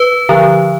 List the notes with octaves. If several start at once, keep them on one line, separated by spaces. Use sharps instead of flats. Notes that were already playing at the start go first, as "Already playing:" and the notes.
Already playing: B4
D3 F3